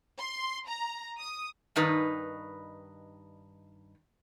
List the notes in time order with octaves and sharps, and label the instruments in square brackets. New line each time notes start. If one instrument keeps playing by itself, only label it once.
[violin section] C6
A#5
D#6
[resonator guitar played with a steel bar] G2 D#3 D#4 B4